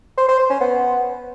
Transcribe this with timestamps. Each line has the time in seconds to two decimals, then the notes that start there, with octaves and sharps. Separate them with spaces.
0.17 C5
0.28 C5
0.39 C5
0.50 C#4
0.60 B3